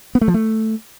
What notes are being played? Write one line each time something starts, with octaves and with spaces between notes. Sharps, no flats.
B3
A3
F3
A3